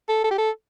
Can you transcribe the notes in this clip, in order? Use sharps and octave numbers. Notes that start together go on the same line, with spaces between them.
A4
A4
G4
A4